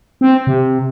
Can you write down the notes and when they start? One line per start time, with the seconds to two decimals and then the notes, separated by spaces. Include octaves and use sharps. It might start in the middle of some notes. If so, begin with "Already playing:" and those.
0.21 C4
0.47 C3